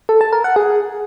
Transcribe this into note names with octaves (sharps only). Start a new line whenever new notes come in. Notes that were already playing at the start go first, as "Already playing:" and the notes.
A4
A5
A#4
F#5
G#4